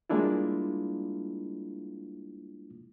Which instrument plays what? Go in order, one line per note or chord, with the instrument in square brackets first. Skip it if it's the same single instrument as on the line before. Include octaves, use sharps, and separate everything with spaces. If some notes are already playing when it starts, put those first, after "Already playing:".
[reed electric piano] G3 G#3 A#3 D4 E4 F4